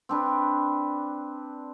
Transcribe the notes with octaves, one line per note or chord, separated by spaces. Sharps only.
C4 D4 B4